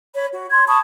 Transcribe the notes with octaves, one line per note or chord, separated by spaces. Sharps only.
C#5 B5
F#4
C6 G#6
A5 B5 C#6 D#6